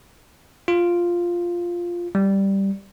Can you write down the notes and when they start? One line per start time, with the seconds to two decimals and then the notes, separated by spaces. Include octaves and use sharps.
0.68 F4
2.15 G3